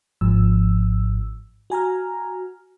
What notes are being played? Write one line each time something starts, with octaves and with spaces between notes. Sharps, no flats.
G#1 G#2 F3 E6
F#4 G#5 A#5 F6